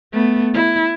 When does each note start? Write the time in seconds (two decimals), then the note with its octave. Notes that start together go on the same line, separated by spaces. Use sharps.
0.13 A3 B3
0.54 E4